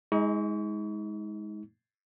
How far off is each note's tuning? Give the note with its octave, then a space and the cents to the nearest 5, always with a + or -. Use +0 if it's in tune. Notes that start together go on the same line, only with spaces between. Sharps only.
G#3 +0 D#4 +40 C#6 +40